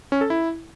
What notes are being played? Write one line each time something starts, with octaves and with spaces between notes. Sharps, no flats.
C#4
A4
E4